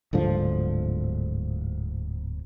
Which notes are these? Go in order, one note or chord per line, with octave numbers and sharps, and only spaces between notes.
D1 G#2 D3 F3